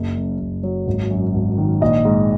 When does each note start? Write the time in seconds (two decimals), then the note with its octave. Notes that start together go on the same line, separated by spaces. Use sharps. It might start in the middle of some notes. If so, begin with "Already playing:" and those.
Already playing: F#1
0.16 F#2
0.40 F#1
0.63 F#3
0.87 G#1
1.11 F#2
1.34 G#1
1.58 D#3
1.81 A#1 D#5
2.05 G#2